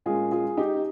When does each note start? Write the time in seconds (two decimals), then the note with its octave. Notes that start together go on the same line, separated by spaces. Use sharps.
0.06 A#2 G#3 C#4 F4 G#4
0.32 F4 G#4
0.57 D#4 G4